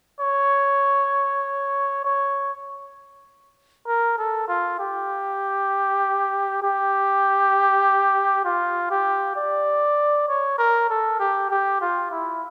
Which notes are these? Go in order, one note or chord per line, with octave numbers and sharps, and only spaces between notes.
C#5
C#5
A#4
A4
F4
G4
G4
F4
G4
D5
C#5
A#4
A4
G4
G4
F4
E4